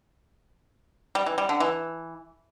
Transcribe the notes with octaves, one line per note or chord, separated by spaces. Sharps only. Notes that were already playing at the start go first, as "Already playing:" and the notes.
G3
E3
G3
D3
E3